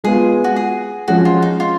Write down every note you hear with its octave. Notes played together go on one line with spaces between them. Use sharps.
G#3 B3 F4 G#4
F#4
G#4
F3 G#3 C#4 F#4
F4
D#4
F4